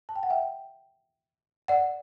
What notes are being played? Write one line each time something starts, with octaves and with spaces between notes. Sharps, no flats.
A5
G5
F#5
E5 G5
D5 F#5